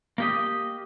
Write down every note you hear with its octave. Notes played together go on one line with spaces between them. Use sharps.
A#3 G4 D#5